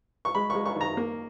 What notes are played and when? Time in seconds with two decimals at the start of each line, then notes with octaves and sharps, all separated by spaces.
0.25 C#6
0.35 G#3 B5
0.50 G#3 C#6
0.66 C#6
0.75 D#3
0.81 A#5
0.97 A#3